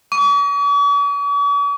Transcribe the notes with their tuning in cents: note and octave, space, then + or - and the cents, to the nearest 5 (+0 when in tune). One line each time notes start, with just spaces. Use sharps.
C#6 +45